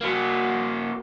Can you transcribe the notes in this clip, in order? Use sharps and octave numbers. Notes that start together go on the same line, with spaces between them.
A#3 F#4